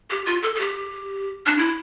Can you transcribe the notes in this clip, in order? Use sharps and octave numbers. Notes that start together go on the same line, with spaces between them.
G4
F4
A4
A4
G4
D4
E4